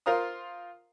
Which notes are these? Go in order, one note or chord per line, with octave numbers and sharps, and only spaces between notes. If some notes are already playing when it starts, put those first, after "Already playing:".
F4 A#4 C5 F5 A#5 D#6